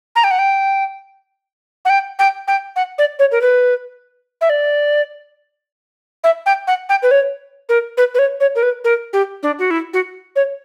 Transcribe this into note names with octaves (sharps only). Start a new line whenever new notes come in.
A#5
G5
F#5
G5
F#5
G5
G5
G5
F#5
D5
C#5
A#4
B4
E5
D5
E5
G5
F#5
G5
B4
C#5
A#4
B4
B4
C#5
C#5
A#4
B4
A#4
G4
D4
F#4
E4
F#4
C#5